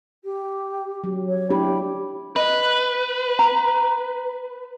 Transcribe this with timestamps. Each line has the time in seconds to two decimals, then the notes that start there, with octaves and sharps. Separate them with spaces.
0.23 G4
1.04 F#3
1.28 C#5
1.50 D4 E4 G4 B5
2.36 B4 D#5
3.39 A#5